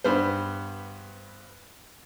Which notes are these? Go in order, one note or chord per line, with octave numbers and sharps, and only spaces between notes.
G2 B3 C5